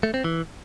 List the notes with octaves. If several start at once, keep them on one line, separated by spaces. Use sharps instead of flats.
A3
C4
E3